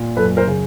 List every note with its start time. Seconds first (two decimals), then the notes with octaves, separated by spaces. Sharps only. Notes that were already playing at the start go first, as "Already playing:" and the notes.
Already playing: A#2
0.17 F#2 A4 B4
0.37 A#4 C5
0.47 C#3